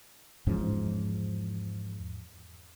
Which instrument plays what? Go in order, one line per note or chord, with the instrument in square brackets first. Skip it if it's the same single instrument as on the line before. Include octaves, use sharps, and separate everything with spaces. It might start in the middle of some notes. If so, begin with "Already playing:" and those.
[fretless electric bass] E2 G#2 F3 C#4